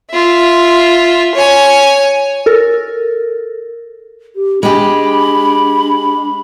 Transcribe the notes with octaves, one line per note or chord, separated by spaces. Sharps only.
F4 E5
C#5 G#5
A4 A#4
G4
G#3 D4 G4 B5